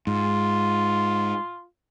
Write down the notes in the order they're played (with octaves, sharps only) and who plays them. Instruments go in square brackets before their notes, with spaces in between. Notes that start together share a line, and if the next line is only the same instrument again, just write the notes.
[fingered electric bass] G#2 [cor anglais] F4